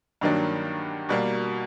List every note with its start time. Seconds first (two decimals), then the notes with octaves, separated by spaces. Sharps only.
0.21 G2 D#3 F#3 A#3 D4
1.09 B2 G3 A#3